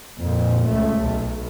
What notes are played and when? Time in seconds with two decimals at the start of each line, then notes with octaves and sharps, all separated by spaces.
0.19 F2 A#2
0.66 C#2 A3
1.02 B1